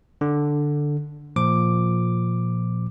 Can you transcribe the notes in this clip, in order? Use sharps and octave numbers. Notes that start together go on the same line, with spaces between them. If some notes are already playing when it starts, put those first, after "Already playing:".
D3
A#2 F3 D6